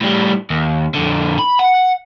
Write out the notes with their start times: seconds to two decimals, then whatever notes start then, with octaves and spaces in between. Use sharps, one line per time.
0.01 A2 G3
0.50 D#2
0.94 F2 D3
1.39 B5
1.59 F#5